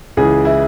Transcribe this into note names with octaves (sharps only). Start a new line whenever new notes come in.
C#2 C#3 E3 G#4
E4